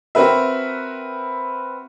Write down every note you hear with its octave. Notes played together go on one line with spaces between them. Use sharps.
C4 F#4 A#4 B4 E5